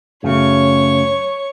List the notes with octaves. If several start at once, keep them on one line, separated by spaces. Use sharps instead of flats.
F#2 C#3 F#3 A3 C#5 C#6